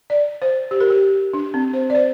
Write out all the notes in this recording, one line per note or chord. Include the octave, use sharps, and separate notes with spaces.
D5
C5
G4
A#4
G4
D4
C4
C5
D5
C5